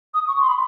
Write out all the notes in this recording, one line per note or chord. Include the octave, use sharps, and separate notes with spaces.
D#6
C#6
C6
B5